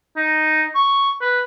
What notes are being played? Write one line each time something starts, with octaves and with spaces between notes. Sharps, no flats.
D#4
C#6
B4